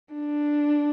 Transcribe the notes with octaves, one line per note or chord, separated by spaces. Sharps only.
D4